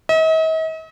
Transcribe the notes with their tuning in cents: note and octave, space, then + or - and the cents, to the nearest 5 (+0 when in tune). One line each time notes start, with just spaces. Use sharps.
D#5 +45